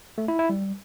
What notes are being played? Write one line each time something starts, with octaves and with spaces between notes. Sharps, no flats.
A3
E4
E4
G3